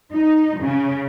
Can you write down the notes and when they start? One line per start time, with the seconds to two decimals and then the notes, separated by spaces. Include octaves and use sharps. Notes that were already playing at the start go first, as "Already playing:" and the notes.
0.12 D#4
0.58 C#3